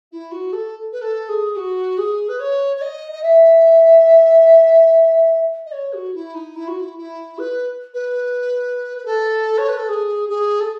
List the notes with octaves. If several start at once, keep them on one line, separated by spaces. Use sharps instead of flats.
E4
F#4
A4
B4
A4
G#4
F#4
G#4
B4
C#5
C#5
D#5
D#5
E5
D#5
C#5
F#4
E4
D#4
E4
F#4
E4
E4
B4
B4
B4
A4
C#5
B4
A4
G#4
G#4
A4